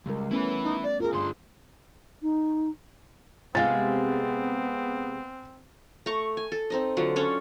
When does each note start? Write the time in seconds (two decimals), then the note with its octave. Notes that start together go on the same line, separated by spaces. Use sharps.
0.06 C#2 G3 A#4
0.31 A3 B3 C#4 E4 B4
0.63 D#4
0.82 D5
1.00 F4 G#4 A#4
1.13 G2 D3 C6
2.22 D#4
3.55 C3 G#3 B3 C4 F5 G#5 A6
6.06 A3 A#5 C#6
6.37 G#5
6.52 A4
6.70 C4 D#4 D#5
6.97 D3 F#3 F4 F#5
7.16 C#4 D4 A4 C#5